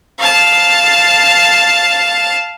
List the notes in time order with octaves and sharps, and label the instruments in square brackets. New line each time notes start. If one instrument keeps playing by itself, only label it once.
[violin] F5 A5